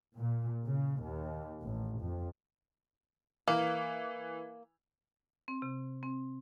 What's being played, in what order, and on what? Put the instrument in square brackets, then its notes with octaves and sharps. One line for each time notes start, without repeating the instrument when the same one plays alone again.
[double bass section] A#2
C#3
D#2
A1
F2
[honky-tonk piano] E3 [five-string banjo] A#3
[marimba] C4
C3
C4